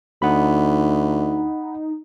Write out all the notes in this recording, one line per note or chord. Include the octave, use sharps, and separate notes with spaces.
D2 D#4 F#5 B5